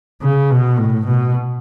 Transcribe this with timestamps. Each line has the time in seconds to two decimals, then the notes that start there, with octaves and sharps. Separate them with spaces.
0.22 C#3
0.50 B2
0.78 A2
1.07 B2